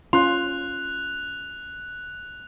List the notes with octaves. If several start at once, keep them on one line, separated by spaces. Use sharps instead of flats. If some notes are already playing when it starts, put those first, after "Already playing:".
C#4 F4 C6 F#6 F7